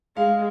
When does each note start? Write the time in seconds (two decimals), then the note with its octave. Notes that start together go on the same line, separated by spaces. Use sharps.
0.16 G#3 F5